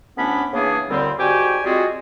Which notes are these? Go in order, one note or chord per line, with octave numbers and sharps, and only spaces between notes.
D2 A2 B3 C#4 D4 B5
C#3 E3 A#3 B3 D4 G#4
D#2 A#2 D3 G3 C4
G#2 G3 F#4 G4 G5 G#5
G3 G#3 C4 F4 F#4 G#4